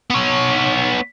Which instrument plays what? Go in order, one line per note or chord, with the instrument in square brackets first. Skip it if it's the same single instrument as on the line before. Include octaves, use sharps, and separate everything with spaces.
[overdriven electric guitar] B3 C#5